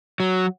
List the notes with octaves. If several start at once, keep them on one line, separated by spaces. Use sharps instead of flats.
F#3